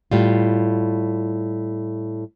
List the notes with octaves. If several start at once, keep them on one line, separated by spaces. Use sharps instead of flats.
A2 G3 F4